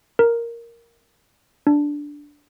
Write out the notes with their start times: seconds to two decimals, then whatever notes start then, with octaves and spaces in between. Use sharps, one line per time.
0.19 A#4
1.67 D4